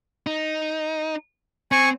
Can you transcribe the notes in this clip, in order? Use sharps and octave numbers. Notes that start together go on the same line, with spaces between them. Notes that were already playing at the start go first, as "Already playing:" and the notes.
D#4
C4 G#5 C#6